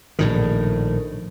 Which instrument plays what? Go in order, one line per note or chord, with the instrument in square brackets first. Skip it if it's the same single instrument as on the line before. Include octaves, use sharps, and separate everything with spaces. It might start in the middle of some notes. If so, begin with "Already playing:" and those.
[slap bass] A#1 A2 D#3